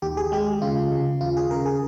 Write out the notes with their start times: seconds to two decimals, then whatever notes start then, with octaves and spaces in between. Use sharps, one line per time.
0.02 D#2 G4
0.17 G#4
0.32 G#3 G4
0.62 C#3 F4
0.92 C#3
1.21 D#2 F4
1.37 G#4
1.51 C#3 A#4
1.66 G#4